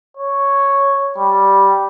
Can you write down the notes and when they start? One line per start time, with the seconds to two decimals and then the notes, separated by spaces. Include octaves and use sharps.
0.17 C#5
1.17 G3